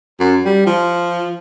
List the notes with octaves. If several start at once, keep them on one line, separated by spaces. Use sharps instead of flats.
F#2
G3
F3